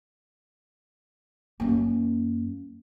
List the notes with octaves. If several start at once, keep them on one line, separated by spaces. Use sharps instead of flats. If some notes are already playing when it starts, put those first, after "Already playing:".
F#2 A#3